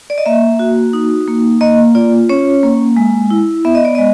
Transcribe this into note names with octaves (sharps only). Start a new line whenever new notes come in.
D5
D#5
A#3 E5
F#4
D#4
A#3
A#3 D#5
F4 D5
C#4 C#5
A#3
G#3
E4
B3 E5
D#5
D5
G#3 D#5